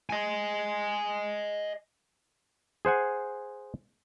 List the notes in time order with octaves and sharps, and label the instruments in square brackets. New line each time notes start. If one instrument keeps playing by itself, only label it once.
[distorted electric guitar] D#5 G#5
[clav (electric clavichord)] G#4 C5 F#5 G#5